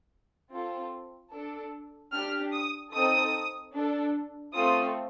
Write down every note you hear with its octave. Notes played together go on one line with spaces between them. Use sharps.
C4 F4 A4
D4 A4
D4 G4 F6
D#6
C4 D#4 A4 D#6
D4 A4
A3 C4 F4 A4 D#6